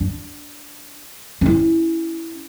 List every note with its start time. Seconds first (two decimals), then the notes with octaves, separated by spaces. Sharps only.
0.01 D4
1.41 C#4 E4